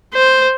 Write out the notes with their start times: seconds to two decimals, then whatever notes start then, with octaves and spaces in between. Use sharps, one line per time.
0.13 C5